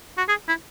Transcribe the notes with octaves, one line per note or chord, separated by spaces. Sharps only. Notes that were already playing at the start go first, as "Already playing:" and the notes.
F#4
G#4
E4